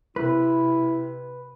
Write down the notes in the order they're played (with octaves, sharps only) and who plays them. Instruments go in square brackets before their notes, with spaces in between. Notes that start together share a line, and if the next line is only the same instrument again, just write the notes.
[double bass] C3 [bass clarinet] E4 [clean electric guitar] B4